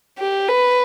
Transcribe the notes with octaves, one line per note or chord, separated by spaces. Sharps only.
G4
B4